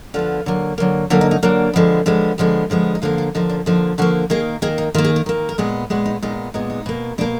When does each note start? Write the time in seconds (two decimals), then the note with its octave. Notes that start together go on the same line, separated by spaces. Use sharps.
0.14 D3 F3 B3 F4
0.46 D3 F#3 A#3
0.78 D3 F#3 A#3
1.10 D3 F#3 A#3 F4
1.21 D#4
1.31 D#4
1.43 D3 F#3 A#3 D4
1.74 D3 F3 G#3 B3
2.06 D3 F3 G#3 B3
2.38 D3 F3 G#3 B3
2.70 D3 F3 G#3 B3
2.95 D#4
3.02 D3 F3 A#3 F4
3.18 F4
3.35 D3 F3 A#3 D#4
3.50 D4
3.66 D3 F3 A#3 D#4
3.98 D3 F3 A#3 F#4
4.30 D#3 A#3 G#4
4.62 D#3 A#3 G#4
4.78 D#4
4.94 D#3 F4
4.98 A#3
5.04 G#4
5.16 A#4
5.26 D#3 A#3
5.49 A#4
5.58 A#2 G#3 B3 G#4
5.90 A#2 G#3 B3 F#4
6.06 D#4
6.22 A#2 G#3 B3 D#4
6.54 A#2 G#3 B3 D#4
6.70 D#4
6.86 B2 A#3
7.18 B2 A#3 D4